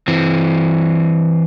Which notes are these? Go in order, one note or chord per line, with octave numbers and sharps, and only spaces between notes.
E3 C4